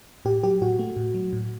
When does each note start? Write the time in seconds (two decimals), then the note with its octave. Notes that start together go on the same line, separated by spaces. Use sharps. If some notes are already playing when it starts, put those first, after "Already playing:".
0.25 A2 G4
0.43 F#3 G4
0.61 A2 F#4
0.79 A3
0.96 A2
1.14 F#3
1.33 A2